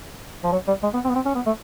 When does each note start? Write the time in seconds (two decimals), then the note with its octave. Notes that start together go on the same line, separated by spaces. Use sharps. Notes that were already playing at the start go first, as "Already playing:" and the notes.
0.44 F3
0.52 F#3
0.68 G3
0.83 G#3
0.94 B3
1.05 C4
1.09 B3
1.15 C4
1.25 C#4
1.35 B3
1.46 A3